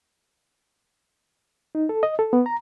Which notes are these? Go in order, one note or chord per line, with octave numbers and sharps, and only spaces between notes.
D#4
A4
D#5
A4
B3
A#5